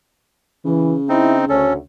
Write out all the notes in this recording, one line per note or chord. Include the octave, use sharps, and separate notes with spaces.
C#3 E3
C4 D#4 E4
D2 C#4 A4 C#5